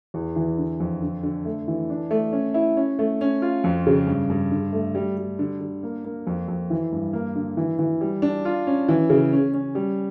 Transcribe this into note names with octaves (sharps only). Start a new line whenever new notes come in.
E2
E3
D3
F2
D3
D3
A3
E3
D4
A3
C#4
E4
C#4
A3
C#4
F4
F2
C#3
G2
G2
D3
A3
G3
G3
D3
D3
A#3
A#3
F2
F2
E3
G2
A#3
D3
E3
E3
G3
D4
F4
C#4
E3
C#3
C#4
C#4
G3